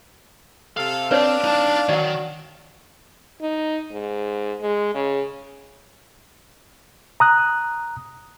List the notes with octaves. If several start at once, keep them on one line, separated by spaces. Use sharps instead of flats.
C3 A4 F5
C4 D4 B4 C#5 D5 F5
D#4 A5
D#3 F#3 D5 F#5
D#4
G#2
G#3
C#3
A#5 D#6 F#6